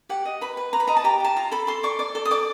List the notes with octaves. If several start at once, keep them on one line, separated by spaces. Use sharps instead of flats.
G4 F#5
D#5
B4 B5
B4
B4 A#5
B5
D#5 A#5
A5
G4 A#5
G4 A5
F4 A#5
A4 B5
A4 C6
D5 C#6
D5 D6
A4
D#6
D5 D6